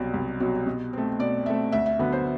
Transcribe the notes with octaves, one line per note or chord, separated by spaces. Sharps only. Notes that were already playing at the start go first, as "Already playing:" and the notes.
Already playing: C2 B2 F#3 D5
C2
B2 F#3
B2
A3 C4
B2 D5
A3 C4 E5
D2 E5
E5
D3 F#3 B3
C5